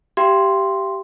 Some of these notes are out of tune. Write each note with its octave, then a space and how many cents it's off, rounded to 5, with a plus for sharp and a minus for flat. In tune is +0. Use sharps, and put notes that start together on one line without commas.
G4 -10 F5 -45 C6 +0